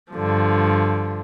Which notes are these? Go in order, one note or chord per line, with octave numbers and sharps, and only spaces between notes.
G2 D3 F3